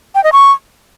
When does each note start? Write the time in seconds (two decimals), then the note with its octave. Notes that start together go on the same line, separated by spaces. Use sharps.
0.15 G5
0.24 D#5
0.33 C#6